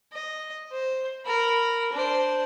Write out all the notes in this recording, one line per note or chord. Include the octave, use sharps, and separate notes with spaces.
D#5
C5
A#4 B5
D4 C5